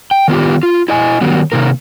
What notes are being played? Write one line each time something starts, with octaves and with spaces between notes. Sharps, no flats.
G5
D#3 B3 F4 G4
F4
E4 D#5 G#5
D#3 F#3 G3 B3
C3 D#3 A#3 A#4